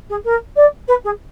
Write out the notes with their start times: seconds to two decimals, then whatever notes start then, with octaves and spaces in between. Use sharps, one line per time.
0.09 G#4
0.24 A#4
0.56 D5
0.87 B4
1.04 G#4